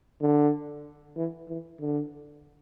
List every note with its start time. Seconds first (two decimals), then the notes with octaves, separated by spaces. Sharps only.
0.21 D3
1.17 E3
1.48 E3
1.80 D3